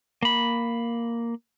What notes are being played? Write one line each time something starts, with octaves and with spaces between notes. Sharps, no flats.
A#3 B5